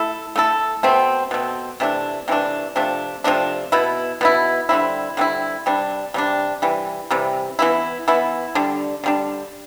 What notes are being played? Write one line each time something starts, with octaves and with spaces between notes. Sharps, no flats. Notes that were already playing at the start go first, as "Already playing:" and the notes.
Already playing: A3 E4 A4
A3 E4 A4
B2 A3 C4
B2 A3 C4
C3 E3 A3 D4
C3 E3 A3 D4
C3 F3 A3 D4
C3 F3 A3 D4
B2 B3 E4
B2 B3 E4
D3 G3 C4 E4
D3 G3 C4 E4
C3 G3 D4
C3 G3 D4
C3 E3 G3
C3 E3 G3
E3 B3 E4
E3 B3 E4
D3 G3 D4
D3 G3 D4